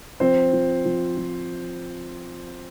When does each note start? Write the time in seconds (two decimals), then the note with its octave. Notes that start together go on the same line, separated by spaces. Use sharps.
0.20 F3 C4 C5
0.53 F3
0.85 F3
1.17 F3